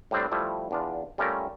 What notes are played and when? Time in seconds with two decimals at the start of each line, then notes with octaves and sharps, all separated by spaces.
0.11 A2 G3 C4 D4
0.32 F3 G3 A3 E4
0.71 E2 D4 F4
1.18 G3 A3 C#4 F4 A#4 E5